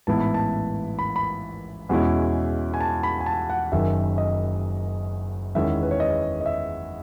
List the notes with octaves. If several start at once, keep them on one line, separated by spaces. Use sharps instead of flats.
A1 G#2 E3 B3 E4 A5
B5
A5
B5
B5
E2 B2 G#3 C#4 E4
G#5
A5
B5
G#5
A5
F#5
F#1 F#2 D#3 E5
D#5
E2 D#3 G#3 C#4 E4 E5
B4
C#5
D#5
D#5
E5